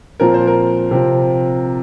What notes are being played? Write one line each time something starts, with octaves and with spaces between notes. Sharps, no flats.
A#2 F3 C4 A#4
C5
A#4
C3 F3 C4